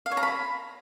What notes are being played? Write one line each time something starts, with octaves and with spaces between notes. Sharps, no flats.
F5
C#5
A#5
B5